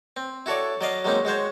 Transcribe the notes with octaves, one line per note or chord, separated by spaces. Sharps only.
C4
E4 F#4 A4 C#5 D5
F#3 D5 D#5 F5
F#3 G#3 A#3 C4 C#4 D#4
G#3 F#4 C5 C#5